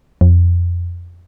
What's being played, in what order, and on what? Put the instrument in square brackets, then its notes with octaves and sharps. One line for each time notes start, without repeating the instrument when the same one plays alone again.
[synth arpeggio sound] F2